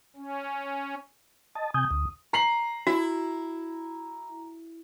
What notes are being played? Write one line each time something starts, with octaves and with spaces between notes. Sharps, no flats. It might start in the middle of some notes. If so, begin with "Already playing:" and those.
C#4
D#5 A5
C3 G#5 D#6 G6
D2
A#5 C7 F#7
E4 F#4